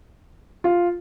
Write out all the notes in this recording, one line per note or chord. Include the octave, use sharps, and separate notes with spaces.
F4